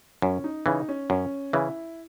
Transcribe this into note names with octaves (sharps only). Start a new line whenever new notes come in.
F#2 C#4
D#4
C#3 E3 D#4
C#4
F#2 C#4
C#3 E3 E4